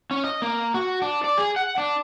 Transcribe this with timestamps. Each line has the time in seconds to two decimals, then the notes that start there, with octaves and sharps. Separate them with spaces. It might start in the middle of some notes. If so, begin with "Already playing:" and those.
0.11 C#4
0.24 D#5
0.42 A#3
0.74 F#4
1.02 D4
1.24 D5
1.38 G#4
1.56 F#5
1.78 D4